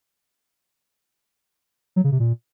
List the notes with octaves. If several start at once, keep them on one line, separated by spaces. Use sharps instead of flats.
F#3
C#3
C3
A#2